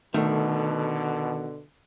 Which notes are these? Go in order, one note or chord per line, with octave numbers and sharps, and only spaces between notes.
B2 D3 D#3 A3